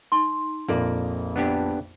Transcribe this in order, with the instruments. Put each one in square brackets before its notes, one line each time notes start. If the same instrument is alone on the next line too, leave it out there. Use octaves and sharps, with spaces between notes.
[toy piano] D#4 C6
[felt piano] A#1 F2 [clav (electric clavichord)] A#3 D5
[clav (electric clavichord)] B3 D4 G4